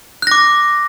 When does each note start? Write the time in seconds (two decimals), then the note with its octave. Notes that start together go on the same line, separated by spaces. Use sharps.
0.22 F#6
0.27 A#6
0.31 D6